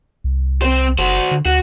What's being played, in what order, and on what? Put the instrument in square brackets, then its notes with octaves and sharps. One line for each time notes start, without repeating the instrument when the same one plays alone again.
[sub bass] C2
[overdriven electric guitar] C4 C5
[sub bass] F#1 [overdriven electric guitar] F#4 C5
[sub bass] D3
[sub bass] D2 [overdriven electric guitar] F#4